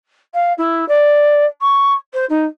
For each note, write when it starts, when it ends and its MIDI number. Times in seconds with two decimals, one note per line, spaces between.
0.34 0.52 77
0.58 0.87 64
0.88 1.45 74
1.61 1.93 85
2.13 2.25 72
2.29 2.45 63